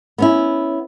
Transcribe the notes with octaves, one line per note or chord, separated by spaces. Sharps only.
B3 C#4 E4